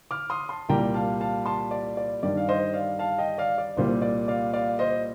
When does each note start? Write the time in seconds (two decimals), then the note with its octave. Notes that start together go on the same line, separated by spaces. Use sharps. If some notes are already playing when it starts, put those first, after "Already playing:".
0.11 D6 F6
0.30 C6 D#6
0.49 A5 C6
0.69 C2 A#2 G3 G5 A#5
0.94 F5 A5
1.21 F5 A5
1.46 A5 C6
1.71 D5
1.97 D5
2.23 G2 D#3 G3 D5
2.37 F5
2.49 C5 D#5
2.73 D5 F5
2.99 F5 A5
3.18 D#5 G5
3.38 D5 F5
3.58 D5
3.77 C2 A#2 G3 C5
4.02 D5
4.28 D5 F5
4.53 D5 F5
4.79 C5 D#5